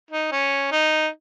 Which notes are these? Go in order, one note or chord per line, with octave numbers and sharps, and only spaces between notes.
D#4
C#4
D#4